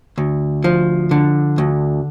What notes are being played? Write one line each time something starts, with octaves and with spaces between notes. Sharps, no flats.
D2
F3
D3
D2